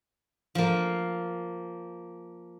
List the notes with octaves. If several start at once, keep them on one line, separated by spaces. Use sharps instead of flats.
F3 A#3